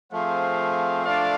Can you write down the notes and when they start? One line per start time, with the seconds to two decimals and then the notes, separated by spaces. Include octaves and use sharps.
0.12 F3 A3 C4 G#4 C5 F5
1.04 D4 A4 D5 F5